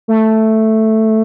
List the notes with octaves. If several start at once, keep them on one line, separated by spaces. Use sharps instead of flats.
A3